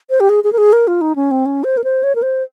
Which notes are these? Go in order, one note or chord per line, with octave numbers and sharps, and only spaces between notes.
C5
G4
G#4
G#4
A#4
G#4
A#4
F4
D#4
C#4
C4
C#4
C5
A#4
C5
C#5
A#4
C5